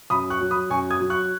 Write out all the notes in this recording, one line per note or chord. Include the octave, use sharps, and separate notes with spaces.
F#2 B5 D#6
C#6 F#6
F#3
B5 D#6
F#2 G#5 C#6
D#6 G#6
F#3
C#6 F#6